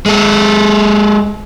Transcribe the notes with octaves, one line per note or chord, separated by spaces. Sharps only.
G#3 A4